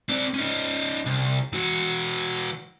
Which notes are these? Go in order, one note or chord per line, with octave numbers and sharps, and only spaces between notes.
C4 D5
C#4 D#4
C2
E3 F#4